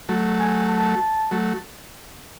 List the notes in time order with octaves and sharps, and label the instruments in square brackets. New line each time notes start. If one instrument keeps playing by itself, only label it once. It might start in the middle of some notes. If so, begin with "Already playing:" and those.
[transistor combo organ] F#3 A3
[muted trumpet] G#5
A5
[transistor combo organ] F#3 A3